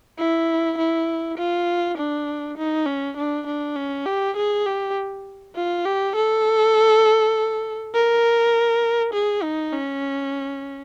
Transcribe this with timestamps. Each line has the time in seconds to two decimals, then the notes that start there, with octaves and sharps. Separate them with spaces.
0.19 E4
0.78 E4
1.38 F4
1.97 D4
2.57 D#4
2.87 C#4
3.17 D4
3.47 D4
3.76 C#4
4.06 G4
4.37 G#4
4.66 G4
5.56 F4
5.86 G4
6.16 A4
7.95 A#4
9.13 G#4
9.43 D#4
9.73 C#4